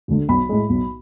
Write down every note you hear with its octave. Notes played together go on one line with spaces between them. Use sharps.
D2 D3 A3
B1 B5
A2 G#3
B1